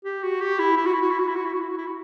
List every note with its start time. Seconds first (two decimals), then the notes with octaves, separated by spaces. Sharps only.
0.05 G4
0.23 F#4
0.41 G4
0.59 E4
0.76 E4
0.85 F#4
0.93 E4
1.02 F#4
1.10 E4
1.19 F#4
1.28 E4
1.35 F#4
1.45 E4
1.53 F#4
1.61 E4
1.70 F#4
1.78 E4
1.87 F#4